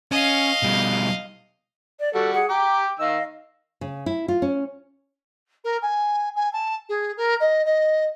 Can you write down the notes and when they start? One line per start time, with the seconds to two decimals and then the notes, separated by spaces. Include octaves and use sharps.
0.12 C#4 D#5 F5
0.63 B2 G3
2.00 D5
2.15 G3 F#4 A4
2.33 G#4 F#5
2.49 G5 A#5 D6
2.99 D#3 D#5 F5 E6
3.81 C#3
4.06 E4
4.28 F4
4.42 C#4
5.64 A#4
5.82 G#5
6.35 G#5
6.52 A5
6.89 G#4
7.17 A#4
7.40 D#5
7.65 D#5